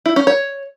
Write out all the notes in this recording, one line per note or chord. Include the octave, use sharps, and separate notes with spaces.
E4
C#4
C#5